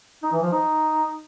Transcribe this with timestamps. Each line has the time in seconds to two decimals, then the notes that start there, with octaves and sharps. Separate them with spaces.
0.23 D#4
0.32 E3
0.42 F3
0.52 D#4